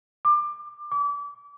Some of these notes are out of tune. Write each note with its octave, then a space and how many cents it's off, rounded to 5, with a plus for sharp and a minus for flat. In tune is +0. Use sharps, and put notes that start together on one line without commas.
D6 +25
D6 -30